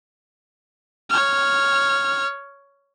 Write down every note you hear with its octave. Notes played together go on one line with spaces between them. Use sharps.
C#5 F6